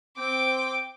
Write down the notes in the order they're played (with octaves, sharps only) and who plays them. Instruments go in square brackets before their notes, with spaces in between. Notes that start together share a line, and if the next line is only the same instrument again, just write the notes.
[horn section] C4 [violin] G5 D6